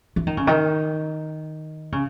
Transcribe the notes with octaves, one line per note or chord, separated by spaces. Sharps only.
E3
D#3
C#3
D#3
C#3